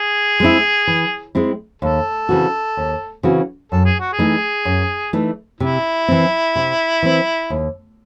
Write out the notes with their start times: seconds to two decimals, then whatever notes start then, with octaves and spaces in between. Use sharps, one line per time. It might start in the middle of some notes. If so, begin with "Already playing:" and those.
Already playing: G#4
0.40 G#3 C4 E4
0.87 E3
1.35 G#3 C4 E4
1.82 D#2 A4
2.29 C#3 E3 C4 F#4
2.77 D#2
3.23 C#3 E3 C4 F#4
3.72 F#2 A4
3.85 G#4
4.00 F#4
4.13 G#4
4.18 E3 A3 D#4
4.65 F#2
5.13 E3 A3 D#4
5.60 C3 E4
6.08 E3 C4
6.55 C3
7.02 E3 C4
7.50 D#2